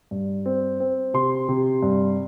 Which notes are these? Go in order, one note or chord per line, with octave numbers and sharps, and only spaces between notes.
G2
C4
C4
C3 C6
C3
G2